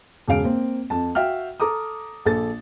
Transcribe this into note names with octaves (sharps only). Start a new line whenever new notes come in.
E1 C#3 F5 D7
A#3 C4
F2 A5
F#4 E5 F5 G5 F6
A4 A#5 D6 D#6
A#1 A4 A6